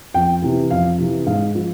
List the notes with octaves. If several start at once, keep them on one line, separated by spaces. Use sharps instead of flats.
F2 G5
C3 E3
F2 F5
C3 E3
G#2 F5
F3